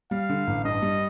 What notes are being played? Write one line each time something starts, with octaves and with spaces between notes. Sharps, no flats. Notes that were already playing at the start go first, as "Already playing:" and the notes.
G3 F5
D3
A1
G2 D#5
G3